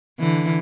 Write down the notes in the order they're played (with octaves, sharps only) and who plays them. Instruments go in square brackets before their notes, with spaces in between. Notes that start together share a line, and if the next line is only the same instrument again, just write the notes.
[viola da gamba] D3 E3